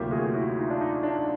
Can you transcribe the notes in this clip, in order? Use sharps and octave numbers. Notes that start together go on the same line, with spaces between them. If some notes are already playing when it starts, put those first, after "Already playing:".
Already playing: D2 C3 D#3 F#3 A#3 F4 G4
F#4 G#4
E4 F#4
D#4 F4
D4
D#4
D4